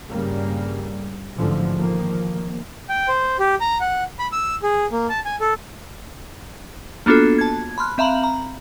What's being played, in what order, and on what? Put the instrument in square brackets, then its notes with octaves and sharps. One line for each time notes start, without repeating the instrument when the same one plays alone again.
[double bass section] G2 C#3 G3 A#3
A1 G#2 D3 E3 F3
D#3 F3 A#3
[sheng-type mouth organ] G5
C5
G4
A#5
F#5
B5
E6
G#4
A#3
A5
G#5
A4
[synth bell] A#3 B3 D4 F4 F#4 A4
A5 G#6
B5 C6 F6 F#6
C4 E5 F5 A#5 B5 F#7
A#5